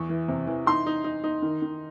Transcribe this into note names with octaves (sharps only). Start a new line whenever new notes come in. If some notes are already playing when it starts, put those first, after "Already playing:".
Already playing: E2 C#6
E3
C3
E3
D#4 C6
D#4
D#4
D#4
D#3
D#3